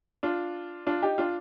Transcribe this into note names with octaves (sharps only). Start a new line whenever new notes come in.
D4 F4
D4 F4
D#4 G4
D4 F4